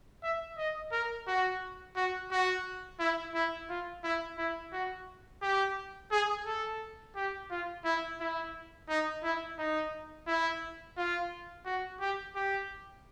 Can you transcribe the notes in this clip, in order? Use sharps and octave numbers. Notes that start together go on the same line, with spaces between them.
E5
D#5
A#4
F#4
F#4
F#4
E4
E4
F4
E4
E4
F#4
G4
G#4
A4
G4
F4
E4
E4
D#4
E4
D#4
E4
F4
F#4
G4
G4